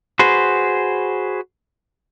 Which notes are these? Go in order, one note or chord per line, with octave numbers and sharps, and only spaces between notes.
F#4 G#4 B4 C5